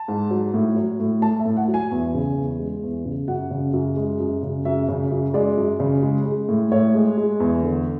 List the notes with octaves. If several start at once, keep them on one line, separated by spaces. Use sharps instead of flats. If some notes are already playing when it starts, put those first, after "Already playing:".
Already playing: A5
G#2
F#3
A2
F#3
A2
A3 A5
E5
A2
F#5
F#3
G#5
E2
C#3
E2
G#3
E2
C#3
F#2 F#5
C#3
F#2
G#3
F#2
C#3
F#2 E5
C#3
F#2
G#3 D5
F#2
C#3
G#3
G#3
A2
A2 C#5
G#3
G#3
E2
D3